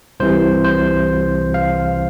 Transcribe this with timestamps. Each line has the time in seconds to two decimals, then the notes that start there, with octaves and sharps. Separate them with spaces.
0.20 C2 C3 E3 C5
0.64 C5
1.54 F5